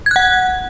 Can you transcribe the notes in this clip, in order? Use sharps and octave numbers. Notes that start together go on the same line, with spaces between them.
F#5 F#6 G#6